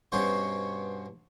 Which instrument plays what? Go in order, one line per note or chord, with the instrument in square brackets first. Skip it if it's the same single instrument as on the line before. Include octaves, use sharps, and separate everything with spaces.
[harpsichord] G2 B2 C#4 C5 C#5